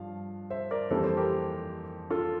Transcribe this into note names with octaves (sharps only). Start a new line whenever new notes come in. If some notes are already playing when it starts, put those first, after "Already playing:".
Already playing: G2 F3 F5
C5 E5
A#4 D5
F2 E3 G3 A#3 A4 C5
A4 C5
G4 A#4
F4 A4